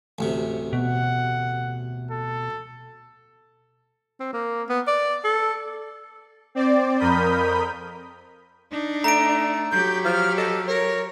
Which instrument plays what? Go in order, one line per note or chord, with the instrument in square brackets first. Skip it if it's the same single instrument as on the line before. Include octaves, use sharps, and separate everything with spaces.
[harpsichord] A1 D2 C3
[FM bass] B2 [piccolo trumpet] F#5
[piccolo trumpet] A4
[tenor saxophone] C4
A#3
B3
D5
A4
[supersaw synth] C4 D5
F2 A#4 B5 D#6 G6
[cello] D4 D#4
[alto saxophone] A3 [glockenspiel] A#5 D7
[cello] F#3 G4 [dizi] G6
[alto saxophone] F3 [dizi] F6
[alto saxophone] A4 [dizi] D#5
[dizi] A#4 [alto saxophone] C#5